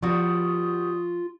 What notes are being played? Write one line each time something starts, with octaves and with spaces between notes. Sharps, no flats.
F3 G3 B3 F4 F#4 C#6 D#6